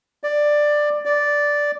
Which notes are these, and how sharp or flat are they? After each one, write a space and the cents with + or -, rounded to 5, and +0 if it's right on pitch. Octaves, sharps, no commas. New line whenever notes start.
D5 +10
D5 -5